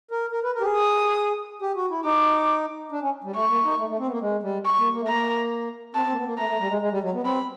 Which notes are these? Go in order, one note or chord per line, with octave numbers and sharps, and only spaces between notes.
A#4
A#4
B4
A#4
G4
G#4
D#6
G4
F#4
E4
D#4 D6
D4
C#4
G3
A3 C#6
A#3
D#4
A3
A3
C4
B3
A#3
G#3
G3
C#6
A#3
A#3
A3
A#3 A#5
C4 A5
C4
A#3
B3
A#3
A3 A#5
A3
G3
G#3
G#3
G3
F#3
B3
C4 B5